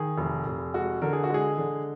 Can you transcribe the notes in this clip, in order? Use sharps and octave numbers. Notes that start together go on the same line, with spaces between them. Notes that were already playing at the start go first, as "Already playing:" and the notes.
Already playing: D#3 G#4
F1
F1
G#3 F#4
D3 A#4
G#4
F#4
G#3 G#4
D3